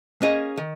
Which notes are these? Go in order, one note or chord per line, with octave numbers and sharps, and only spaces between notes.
A#3 C#4 G#4 D#5
D#3